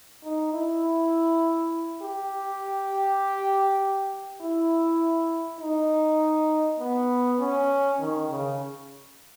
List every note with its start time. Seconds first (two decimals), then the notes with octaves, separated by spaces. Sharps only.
0.24 D#4
0.53 E4
2.02 G4
4.42 E4
5.60 D#4
6.79 B3
7.39 C#4
7.99 D#3
8.29 C#3